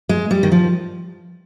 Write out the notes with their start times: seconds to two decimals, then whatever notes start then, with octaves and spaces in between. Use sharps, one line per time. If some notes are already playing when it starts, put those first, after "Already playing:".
0.09 G#3
0.31 G3
0.43 D#3
0.52 F3